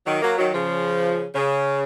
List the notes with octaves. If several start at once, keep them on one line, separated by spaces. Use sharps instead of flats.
D#3 F#3
F#3 A#3
D#3 F#3
C#3 F3
C#3